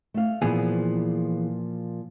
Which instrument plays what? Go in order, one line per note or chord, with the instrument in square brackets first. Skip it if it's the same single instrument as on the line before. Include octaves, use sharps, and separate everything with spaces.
[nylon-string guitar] A3 F5
[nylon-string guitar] A#2 F3 [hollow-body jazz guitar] E3 B3 G#4